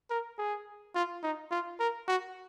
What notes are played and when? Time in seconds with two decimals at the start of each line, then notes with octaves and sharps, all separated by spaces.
0.10 A#4
0.38 G#4
0.95 F4
1.23 D#4
1.51 F4
1.79 A#4
2.08 F#4